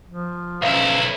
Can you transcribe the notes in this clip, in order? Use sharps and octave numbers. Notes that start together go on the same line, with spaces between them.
F3
B1 C#4 E4 F5